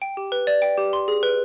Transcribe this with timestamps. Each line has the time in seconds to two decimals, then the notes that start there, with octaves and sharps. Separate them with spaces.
0.02 G5
0.17 G4
0.32 B4
0.47 D5
0.62 G5
0.77 G4
0.93 C6
1.08 G#4
1.23 B4